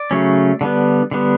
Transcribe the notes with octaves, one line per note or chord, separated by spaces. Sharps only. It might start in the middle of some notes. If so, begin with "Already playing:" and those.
Already playing: D5
C#3 F#3 A3 C#4
D3 G3 B3
D3 G3 B3